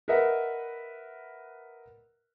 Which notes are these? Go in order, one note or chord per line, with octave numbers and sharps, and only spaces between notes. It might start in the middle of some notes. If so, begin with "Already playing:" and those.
A#4 B4 D#5 E5 F#5